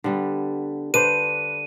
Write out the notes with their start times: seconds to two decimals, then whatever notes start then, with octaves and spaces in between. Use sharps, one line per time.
0.04 D3 G3 B3
0.94 D3 D4 B4 C5 D#7